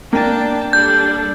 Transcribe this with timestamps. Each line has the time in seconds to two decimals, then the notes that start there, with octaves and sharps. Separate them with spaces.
0.13 A#3 D4 G5 A5
0.73 G3 D4 A4 G6